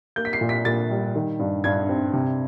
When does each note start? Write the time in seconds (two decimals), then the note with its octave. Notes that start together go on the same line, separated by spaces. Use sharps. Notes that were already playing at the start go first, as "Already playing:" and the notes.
0.16 A#3 G6
0.25 B6
0.33 C7
0.41 A#2
0.49 B6
0.65 A#2 A6
0.90 G3
1.15 D#3
1.39 G2
1.64 G2 G#6
1.89 C4
2.14 C3